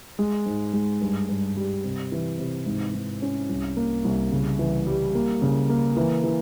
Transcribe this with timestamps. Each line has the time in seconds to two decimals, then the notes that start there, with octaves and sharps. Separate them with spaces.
0.19 G#3
0.46 G#2
0.73 G#3
1.01 G2
1.29 G2
1.56 G3
1.84 C3
2.12 E3
2.39 C3
2.66 G#2
2.94 G#2
3.22 C#4
3.49 C2
3.77 A#3
4.04 C2
4.32 C#3
4.59 E3
4.87 G3
5.15 A#3
5.42 C#3
5.69 A#3
5.97 E3
6.24 E3